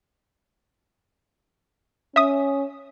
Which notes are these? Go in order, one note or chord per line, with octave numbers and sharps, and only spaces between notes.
C#4 E5 D#6